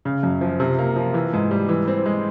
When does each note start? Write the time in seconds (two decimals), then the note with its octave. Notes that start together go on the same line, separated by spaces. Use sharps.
0.05 C#3
0.23 F#2
0.41 F3
0.60 C3
0.79 A#3
0.96 F3
1.14 E3
1.33 G#2
1.51 G3
1.69 E3
1.88 C4
2.06 G#3